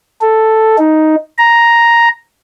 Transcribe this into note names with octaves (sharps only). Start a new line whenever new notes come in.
A4
D#4
A#5